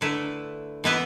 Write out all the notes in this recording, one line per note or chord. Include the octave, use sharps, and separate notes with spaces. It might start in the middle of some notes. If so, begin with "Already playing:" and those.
D3 A3 E4 B4
E3 B3 E4 B4